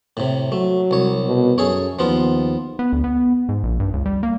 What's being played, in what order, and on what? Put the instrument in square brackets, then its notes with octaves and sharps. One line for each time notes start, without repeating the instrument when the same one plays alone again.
[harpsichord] A2 C3
[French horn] F#3 [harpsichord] A3
[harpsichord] C2 C#5
[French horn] B2
[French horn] F#2 [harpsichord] G#4 A4 C#5
[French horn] D#2 [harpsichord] F3 B3 F4
[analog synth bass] B3
D2
B3
G#2
A#1
G2
C#2
G3
A#3